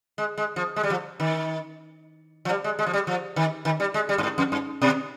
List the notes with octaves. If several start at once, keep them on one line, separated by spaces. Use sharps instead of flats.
G#3
G#3
F3
G#3
G3
F3
D#3
F3
G3
G#3
G#3
F3
G3
F3
D#3
D#3
G3
G#3
G3
G2
G#2
F2
G2
B2